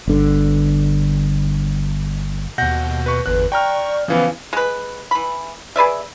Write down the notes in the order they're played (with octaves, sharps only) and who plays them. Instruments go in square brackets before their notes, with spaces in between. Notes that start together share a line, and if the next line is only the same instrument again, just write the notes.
[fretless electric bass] G1 D3
[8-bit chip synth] D#2 B2 [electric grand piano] F#5 G6 A#6
[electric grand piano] B4 C#6
[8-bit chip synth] G1 E2 [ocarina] B4 [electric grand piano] F#6
[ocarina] D5 [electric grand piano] G5 A#5 F6 [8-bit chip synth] C#6
[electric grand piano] C#3 E3 B3 [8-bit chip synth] F3 [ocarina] F5
[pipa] G#3 B4
E3 B5
G#4 B4 D5 E5